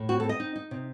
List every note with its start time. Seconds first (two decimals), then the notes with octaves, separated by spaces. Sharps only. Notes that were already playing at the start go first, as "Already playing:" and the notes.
Already playing: A2
0.09 C4 F#4
0.20 C4 A4
0.29 D#5
0.40 D#4
0.56 D#4
0.71 C3